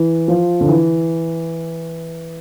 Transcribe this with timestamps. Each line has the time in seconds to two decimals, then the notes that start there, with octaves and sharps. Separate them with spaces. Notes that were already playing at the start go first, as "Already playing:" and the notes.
Already playing: E3
0.28 F3
0.61 D3
0.69 E3